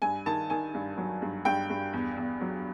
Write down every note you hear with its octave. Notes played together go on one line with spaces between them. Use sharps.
G2 G#5
D#3 A5
D#3 G#5
G2
F#3
G2
G2 G5
G2
E2
E2
F#3